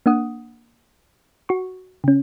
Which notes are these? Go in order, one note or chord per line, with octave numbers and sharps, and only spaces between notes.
A#3 D4 F#5 D#6
F#4 C#6
C#3 C#4